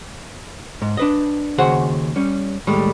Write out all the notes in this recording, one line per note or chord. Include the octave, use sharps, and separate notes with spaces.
G#2
D4 B4 D#5
D#2 C#3 F#4 G#4 C5 F#5
G3 C#4
D#2 A2 G3 G#3